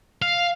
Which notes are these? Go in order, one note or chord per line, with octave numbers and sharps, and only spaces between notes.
F5